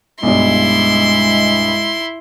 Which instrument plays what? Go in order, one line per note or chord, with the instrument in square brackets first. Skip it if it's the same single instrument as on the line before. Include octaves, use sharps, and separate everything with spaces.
[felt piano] B1 G2 [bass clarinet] G#3 [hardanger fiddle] E4 C6